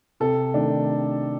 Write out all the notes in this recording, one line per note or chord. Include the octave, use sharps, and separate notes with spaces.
C3 A4
D#3 A3 D4